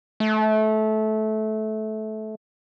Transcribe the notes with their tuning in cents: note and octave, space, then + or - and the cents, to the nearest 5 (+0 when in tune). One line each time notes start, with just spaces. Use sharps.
A3 -20